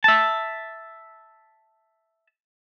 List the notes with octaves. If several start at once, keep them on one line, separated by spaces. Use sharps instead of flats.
E5 A5